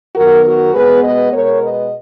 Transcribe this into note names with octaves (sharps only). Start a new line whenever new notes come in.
F#2 D#3 F#3 B3 F#4 A#4
F#4 A#4
B2 G#3 B3 G#4 B4
B4 D#5
B2 G#3 B3 A#4 C#5
B4 D#5